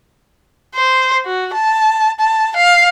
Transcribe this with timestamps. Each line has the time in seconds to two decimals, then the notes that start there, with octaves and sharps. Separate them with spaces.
0.75 C5
1.25 F#4
1.54 A5
2.20 A5
2.57 F5